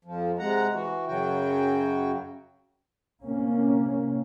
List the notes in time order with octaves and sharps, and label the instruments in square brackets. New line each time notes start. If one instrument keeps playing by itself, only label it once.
[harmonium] F2 F3
C3 G#3 F#5 A#5
E3 F#4
F#2 C#3 F#3 F#4 G5
[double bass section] C3 A#3 C#4